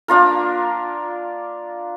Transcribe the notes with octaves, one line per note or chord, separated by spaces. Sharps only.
A#3 D4 F4 A#4